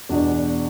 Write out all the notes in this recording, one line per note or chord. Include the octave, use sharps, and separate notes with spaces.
E2 B2 D4